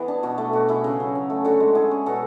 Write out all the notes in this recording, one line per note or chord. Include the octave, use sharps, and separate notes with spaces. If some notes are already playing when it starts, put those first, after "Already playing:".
Already playing: E3 B3 G#4 B4
D4
B2 F#4
A3
B2 F#4
E4 G#4
C#3
F#3
C#4
A3
D3 F#4 A4
G#3
E4 G#4
C#4
B2 F#4 A4